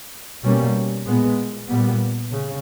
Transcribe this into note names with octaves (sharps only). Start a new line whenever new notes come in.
B2 G3 A#3 C#4
A#2 G#3 B3
A#2 G3 B3
C#3